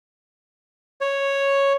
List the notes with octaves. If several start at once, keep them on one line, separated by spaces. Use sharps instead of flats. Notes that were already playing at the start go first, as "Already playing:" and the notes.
C#5